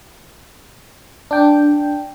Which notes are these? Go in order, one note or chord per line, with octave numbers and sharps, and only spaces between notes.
D4 G5